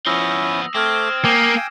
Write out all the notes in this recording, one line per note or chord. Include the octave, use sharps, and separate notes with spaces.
F3 B3 C#4 E4 D#6 E6 A#6
A3 C4 D6 F6 G#6 A#6
A#3 G5 G#5 D6 D#6